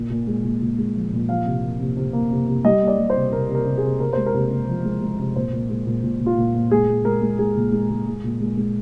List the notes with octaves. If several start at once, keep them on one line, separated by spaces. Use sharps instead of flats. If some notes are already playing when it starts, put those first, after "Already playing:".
Already playing: A#2
A#2
G#3
A#2
A#2
G#3
F3
A#2
F3 F5
C3
A#3
C3
C3
A#3
C3
C3
G3 D#5
A#3
D5
G3
C5
C3
C3 A#4
C3
A#4
C3
C3 G#4
C3 A#4
G#3 C5
A#4
C3
C3
F3
G#3
G#3
C3
A#2 C5
A#2
G#3
A#2
A#2
A#2
F4
A#2
A#2
G#3 G#4
G#3
G#3 A#4
G#3
G#3 G#4
A#2
G#3
G#3
G#3
A#2
G#3
G#3